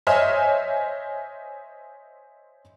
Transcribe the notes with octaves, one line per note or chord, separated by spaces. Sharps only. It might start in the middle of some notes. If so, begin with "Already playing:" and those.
C5 C#5 D#5 E5 G#5 F6